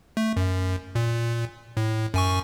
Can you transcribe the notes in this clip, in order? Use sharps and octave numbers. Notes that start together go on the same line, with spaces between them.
A3
F#2
A#2
A2
F#2 G#5 C#6